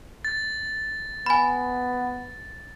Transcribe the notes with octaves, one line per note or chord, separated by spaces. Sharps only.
A6
B3 G#5 B5